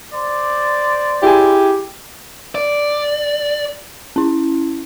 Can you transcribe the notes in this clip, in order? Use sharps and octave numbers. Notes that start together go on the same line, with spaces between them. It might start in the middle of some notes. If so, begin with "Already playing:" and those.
C5 D5
E4 G4 G#4 G#5
D5
C#4 E4